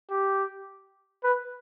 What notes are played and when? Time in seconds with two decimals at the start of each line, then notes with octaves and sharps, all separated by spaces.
0.10 G4
1.24 B4